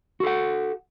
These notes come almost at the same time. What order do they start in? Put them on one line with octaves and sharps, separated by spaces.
F#4 A4 F#5